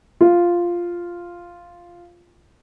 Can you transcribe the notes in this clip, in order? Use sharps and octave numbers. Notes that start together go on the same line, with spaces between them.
F4